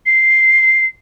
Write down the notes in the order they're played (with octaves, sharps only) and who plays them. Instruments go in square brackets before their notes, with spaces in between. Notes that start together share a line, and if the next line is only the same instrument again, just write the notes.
[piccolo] C7